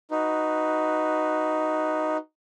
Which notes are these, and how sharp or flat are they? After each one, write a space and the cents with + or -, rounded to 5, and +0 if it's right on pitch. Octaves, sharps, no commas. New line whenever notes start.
D#4 +0 F#4 +0 B4 +0